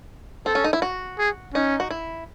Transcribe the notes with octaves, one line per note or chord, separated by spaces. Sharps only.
C4 A4
C#4
D#4
E4
F#4
G#4
C#4 D#4
F#4
E4